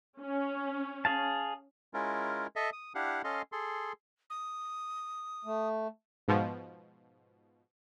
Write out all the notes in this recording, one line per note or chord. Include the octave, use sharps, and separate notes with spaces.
C#4
G#4 F5 A5
G#3 C#4 E4 F4 A#4
A4 D#5 E5
D#6
D4 E4 G4 F5 F#5
C#4 A4 D#5 F5 C6
G#4 A4 C6
D#6
A3
G#2 B2 F3